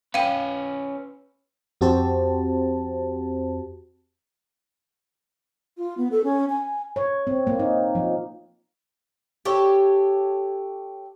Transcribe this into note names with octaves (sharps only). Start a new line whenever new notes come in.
C#4 B4 F5 G5 D#7
F2 C4 F#4 G4 C5 A5
F4
B3
A4
C#4
G#5
C#5
C4
A#3
D#4
F3
G4 A4 C#5